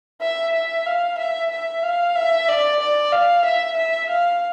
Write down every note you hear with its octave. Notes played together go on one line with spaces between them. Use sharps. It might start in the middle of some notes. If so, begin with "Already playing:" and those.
E5
E5
F5
E5
E5
F5
E5
D5
D5
F5
E5
E5
F5